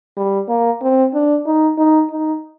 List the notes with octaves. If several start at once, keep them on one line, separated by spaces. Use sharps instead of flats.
G3
A#3
C4
D4
D#4
D#4
D#4